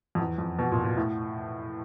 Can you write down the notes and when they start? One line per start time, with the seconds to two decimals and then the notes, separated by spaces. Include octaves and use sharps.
0.15 F2
0.19 E2
0.38 F2
0.59 B2
0.72 A#2
0.84 A#2
0.97 A2